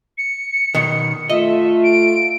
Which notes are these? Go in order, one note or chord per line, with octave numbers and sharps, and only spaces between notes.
C#7
B2 D#3
A3 F4 D#5 E5
D7